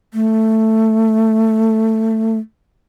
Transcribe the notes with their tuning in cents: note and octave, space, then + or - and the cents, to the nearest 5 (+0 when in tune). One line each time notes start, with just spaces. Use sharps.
A3 +10